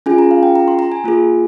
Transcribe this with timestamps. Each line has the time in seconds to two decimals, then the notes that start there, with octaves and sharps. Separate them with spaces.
0.06 C#4 F4 G#4 G#5
0.18 A#5
0.31 F5
0.43 G5
0.56 A#5
0.68 C6
0.79 A#5
0.92 G#5
1.04 A#3 F4 G#4